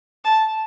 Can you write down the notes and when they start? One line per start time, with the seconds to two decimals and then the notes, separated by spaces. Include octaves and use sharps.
0.24 A5